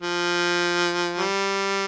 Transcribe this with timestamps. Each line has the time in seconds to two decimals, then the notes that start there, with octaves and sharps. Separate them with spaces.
0.01 F3
1.19 G3